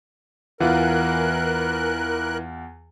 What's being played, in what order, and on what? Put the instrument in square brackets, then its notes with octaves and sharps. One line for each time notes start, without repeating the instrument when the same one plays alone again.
[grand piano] E2 F4 [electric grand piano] E3 [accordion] A#4 F#6